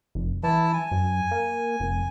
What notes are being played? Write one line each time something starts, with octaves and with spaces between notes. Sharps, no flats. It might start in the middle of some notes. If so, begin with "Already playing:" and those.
F1
E3 E4 A5
G#5
F#2
A#3
F1